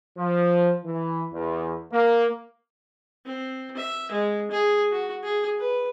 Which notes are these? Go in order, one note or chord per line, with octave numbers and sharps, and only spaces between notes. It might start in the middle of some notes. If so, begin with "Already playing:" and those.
F3
E3
E2
A#3
C4
E5
G#3
G#4
F#4
G#4
B4